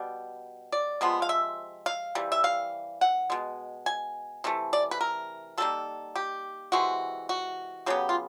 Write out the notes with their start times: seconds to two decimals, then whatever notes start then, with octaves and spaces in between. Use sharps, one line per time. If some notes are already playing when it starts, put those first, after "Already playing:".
Already playing: B2 G3
0.72 D5
1.01 C3 F3 G#3 B3
1.22 F5
1.29 E5
1.86 F5
2.15 C3 E3 G3
2.32 E5
2.44 F5
3.01 F#5
3.30 B2 G#3
3.86 G#5
4.44 C3 E3 A3
4.73 D5
4.91 B4
5.01 A#4
5.58 D#3 G3 A#3 A4
6.16 G4
6.72 C3 E3 G#3 F#4
7.29 F#4
7.86 C#3 F#3 B3 G4
8.09 F4